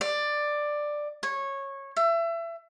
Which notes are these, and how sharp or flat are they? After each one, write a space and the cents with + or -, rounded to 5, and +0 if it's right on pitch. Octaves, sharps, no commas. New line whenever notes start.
D5 +10
C#5 -15
E5 +30